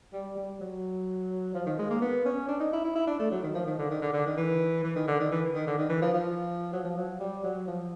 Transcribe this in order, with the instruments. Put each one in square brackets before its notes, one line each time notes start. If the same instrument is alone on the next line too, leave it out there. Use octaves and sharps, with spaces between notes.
[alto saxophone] G3
G3
F#3
F3
D#3
G#3
A#3
B3
C#4
D4
D#4
E4
E4
E4
D4
A3
F#3
D#3
F3
D#3
D3
D#3
D3
D3
D#3
E3
E3
D#3
D3
D#3
E3
D#3
D3
D#3
E3
F3
F3
F#3
F3
F#3
G3
F#3
F3